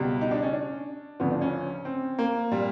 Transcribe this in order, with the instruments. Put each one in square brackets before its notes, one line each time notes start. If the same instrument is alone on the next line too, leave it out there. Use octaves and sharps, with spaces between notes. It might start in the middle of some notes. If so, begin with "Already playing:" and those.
Already playing: [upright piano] C#2 B2 G3
D#4
D4
C#4
D4
D2 C#3 F3 B3
D4
C#4
C4
A#3
A#2 G3